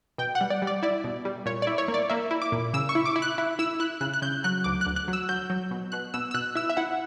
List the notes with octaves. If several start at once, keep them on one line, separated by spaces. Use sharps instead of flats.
B2 G5
F#5
G3
D5
G3
D5
E4 D5
B2
G3
A#2 C#5
E4 D5
C#5
A#3
D5
A#3 E5
E4
D6
A#2
C#3 E6
C#6
E4
D6
E4
F#6
E4
E4 E6
E4 F#6
C#3 F#6
F#6
C#3 G6
F#3 F#6
D2 D6
F#6
D2
F#6
F#3
E6
F#3 G6
F#3
B2
B2 F#6
B2 E6
E6
B2 F#6
E4 E6
E5
E4 F#5